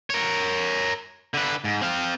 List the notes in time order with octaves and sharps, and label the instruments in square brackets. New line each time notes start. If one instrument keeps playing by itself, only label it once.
[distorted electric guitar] A#4 C#5
D3 B4
G#2
C4 F5